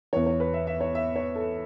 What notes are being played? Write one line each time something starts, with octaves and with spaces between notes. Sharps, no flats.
E2 E3 C#5
C#5
B4
E5
E5
C#5
E5
C#5
A4